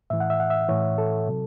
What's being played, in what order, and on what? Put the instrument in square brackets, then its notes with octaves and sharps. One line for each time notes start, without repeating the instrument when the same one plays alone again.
[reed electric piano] A2 E3 E5
F#5
E5
F#5
E5
A2 E3 C#5
A4
C3 F#3